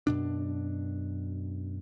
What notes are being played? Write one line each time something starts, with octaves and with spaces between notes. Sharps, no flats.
F#2 B2 D4